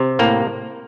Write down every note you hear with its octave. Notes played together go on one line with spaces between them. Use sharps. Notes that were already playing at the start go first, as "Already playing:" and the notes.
Already playing: C3
A2 A#3